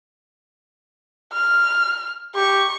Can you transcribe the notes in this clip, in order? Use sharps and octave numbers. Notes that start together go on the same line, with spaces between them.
F6
G4 C#6